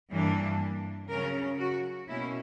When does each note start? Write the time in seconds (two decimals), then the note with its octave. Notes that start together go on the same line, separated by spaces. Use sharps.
0.11 G2 E3 A#3 D4
1.09 C#3 F#3 C#4 A#4
1.59 F#4
2.08 B2 A#3 C#4 E4